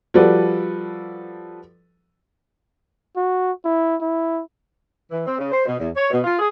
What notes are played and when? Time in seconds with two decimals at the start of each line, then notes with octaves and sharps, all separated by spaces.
0.14 F3 G3 F#4 A4 B4 D5
3.16 F#4
3.65 E4
4.01 E4
5.11 E3
5.26 C4
5.39 C#3
5.52 C5
5.65 B2
5.79 E2
5.96 C#5
6.10 B2
6.24 F4
6.38 G#4